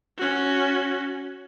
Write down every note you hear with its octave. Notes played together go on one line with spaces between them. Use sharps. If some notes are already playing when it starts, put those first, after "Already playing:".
C#4 F#4